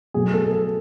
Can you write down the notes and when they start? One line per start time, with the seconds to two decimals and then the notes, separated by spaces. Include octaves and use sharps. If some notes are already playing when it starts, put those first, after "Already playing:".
0.14 B2 F#3 A3 G#4
0.33 A4
0.52 A4